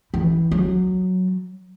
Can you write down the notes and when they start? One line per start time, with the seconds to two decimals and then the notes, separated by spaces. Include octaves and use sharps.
0.14 E3
0.51 F#3